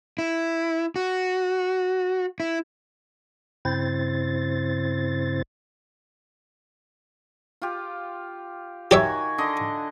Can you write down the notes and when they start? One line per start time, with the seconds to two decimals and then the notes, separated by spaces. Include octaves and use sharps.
0.18 E4
0.96 F#4
2.40 E4
3.65 G2 C#3 C4 E4 C5 A6
7.62 F4 G4
8.91 D#3 F#4 G4 C#5 E5 G#5
9.38 D3 D#5